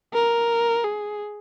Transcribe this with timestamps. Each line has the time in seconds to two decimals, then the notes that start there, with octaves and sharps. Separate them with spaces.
0.13 A#4
0.84 G#4